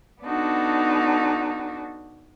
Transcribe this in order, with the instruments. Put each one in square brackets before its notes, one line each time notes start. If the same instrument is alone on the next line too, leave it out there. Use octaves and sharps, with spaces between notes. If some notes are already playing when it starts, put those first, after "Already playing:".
[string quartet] B3 D4 D#4 F#4 A4